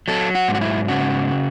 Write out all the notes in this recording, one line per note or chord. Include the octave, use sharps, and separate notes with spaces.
F#3 A4
F#4
G#2
F#4
E4
C#3 F#4